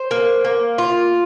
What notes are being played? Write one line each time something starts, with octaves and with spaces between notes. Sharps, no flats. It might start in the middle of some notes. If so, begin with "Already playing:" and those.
Already playing: C5
A#3
A#3
F4